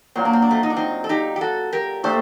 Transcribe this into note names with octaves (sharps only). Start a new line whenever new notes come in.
A#2 F#3 A#3 C4
D4
C4
D4
A3 C4
D#4
D4
C4 D#4
A4
D#4 G4
G4
F#4 A4
G4 A#4
A#2 A3 D4 G4 A4 C5